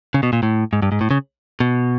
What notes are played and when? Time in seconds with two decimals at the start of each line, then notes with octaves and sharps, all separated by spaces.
0.14 C#3
0.23 B2
0.33 A#2
0.43 A2
0.73 G#2
0.82 G2
0.92 G#2
1.01 A2
1.11 C#3
1.60 B2